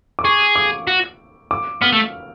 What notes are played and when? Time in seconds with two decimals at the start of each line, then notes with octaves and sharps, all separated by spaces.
0.19 D6
0.24 G#4 C#6
0.56 D6
0.87 F#4
1.51 D6
1.81 B3 F6
1.92 A3